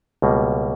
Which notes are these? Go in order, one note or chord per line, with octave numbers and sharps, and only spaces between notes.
C#2 B2 G3 A#3